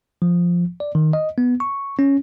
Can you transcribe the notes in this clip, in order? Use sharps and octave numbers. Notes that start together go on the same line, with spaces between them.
F3
D5
D#3
D#5
B3
C#6
C#4